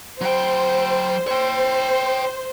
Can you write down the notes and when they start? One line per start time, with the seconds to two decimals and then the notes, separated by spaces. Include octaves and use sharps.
0.21 F#3 C5 G5
1.28 C5 C#5 G5